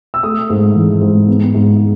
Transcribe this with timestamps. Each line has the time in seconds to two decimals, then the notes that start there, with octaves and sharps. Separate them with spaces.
0.14 E6
0.23 A3 D#6
0.50 G#2
0.76 E3
1.01 G#2
1.28 B3
1.54 G#2